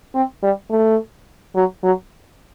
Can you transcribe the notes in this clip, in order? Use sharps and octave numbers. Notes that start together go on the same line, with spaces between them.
C4
G3
A3
F#3
F#3